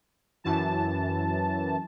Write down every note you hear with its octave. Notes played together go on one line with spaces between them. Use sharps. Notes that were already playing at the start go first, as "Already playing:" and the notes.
F#2 E3 A5